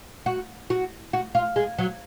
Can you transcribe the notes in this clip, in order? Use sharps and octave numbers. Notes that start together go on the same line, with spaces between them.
F#4
F#4
F#4
F4
G#3
F#3